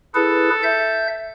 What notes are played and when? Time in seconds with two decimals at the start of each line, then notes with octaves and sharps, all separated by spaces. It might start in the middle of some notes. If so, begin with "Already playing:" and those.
0.15 E4 G#4 A4 B4
0.63 E5 G6